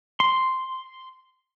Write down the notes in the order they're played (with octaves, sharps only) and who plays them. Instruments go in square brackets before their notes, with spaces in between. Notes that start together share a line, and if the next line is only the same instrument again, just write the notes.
[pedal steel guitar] C6